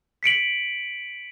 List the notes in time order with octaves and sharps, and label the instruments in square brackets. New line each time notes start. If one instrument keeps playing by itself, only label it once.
[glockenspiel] B6 C#7 D7 F#7